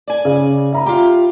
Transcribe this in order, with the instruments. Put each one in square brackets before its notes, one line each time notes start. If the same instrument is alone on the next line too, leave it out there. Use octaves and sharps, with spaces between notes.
[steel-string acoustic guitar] D5 G#5
[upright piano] C#3
E5 A#5 B5
[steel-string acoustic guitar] F4 G4